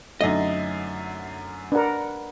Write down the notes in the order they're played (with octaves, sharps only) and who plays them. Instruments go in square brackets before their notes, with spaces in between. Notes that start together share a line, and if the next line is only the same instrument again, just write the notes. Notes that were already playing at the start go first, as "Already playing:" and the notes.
[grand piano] F#2 D3 [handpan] A3 D#4 [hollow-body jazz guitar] D#5
[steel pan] D4 A#4 [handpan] B4 F#5